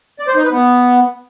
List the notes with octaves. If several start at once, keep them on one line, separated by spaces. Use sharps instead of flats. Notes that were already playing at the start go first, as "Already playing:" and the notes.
D5
C5
D#4
B4
B3